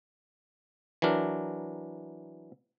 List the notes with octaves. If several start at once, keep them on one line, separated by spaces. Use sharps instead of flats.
E3 F#3 D4 A#4